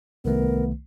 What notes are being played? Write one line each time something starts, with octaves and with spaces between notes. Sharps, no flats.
C2 D#3 A3 B3 A#4